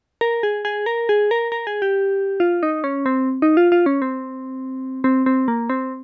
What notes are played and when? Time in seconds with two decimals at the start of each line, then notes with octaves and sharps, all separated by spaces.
0.21 A#4
0.43 G#4
0.65 G#4
0.86 A#4
1.09 G#4
1.31 A#4
1.52 A#4
1.67 G#4
1.82 G4
2.40 F4
2.63 D#4
2.84 C#4
3.06 C4
3.42 D#4
3.57 F4
3.72 F4
3.86 C#4
4.02 C4
5.04 C4
5.26 C4
5.48 A#3
5.69 C4